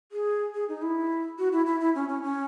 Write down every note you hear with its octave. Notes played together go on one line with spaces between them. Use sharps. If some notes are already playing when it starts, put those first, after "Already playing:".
G#4
G#4
D#4
E4
F#4
E4
E4
E4
C#4
C#4
C#4